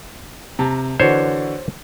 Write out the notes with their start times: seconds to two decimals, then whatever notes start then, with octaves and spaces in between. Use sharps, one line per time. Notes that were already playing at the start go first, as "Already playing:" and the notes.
0.59 C3 A5 A#5
1.00 D3 E3 F#4 C5 C#5